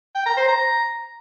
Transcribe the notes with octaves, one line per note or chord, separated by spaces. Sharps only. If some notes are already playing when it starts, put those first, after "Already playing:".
G5
A#5
C5
A#5